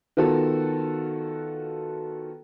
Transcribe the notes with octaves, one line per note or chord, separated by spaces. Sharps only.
D#3 B3 F4 F#4 A4